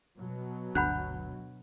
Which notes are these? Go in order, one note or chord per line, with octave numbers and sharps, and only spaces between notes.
B2 F#3
G1 D2 D4 F#5 B5 F#6 G6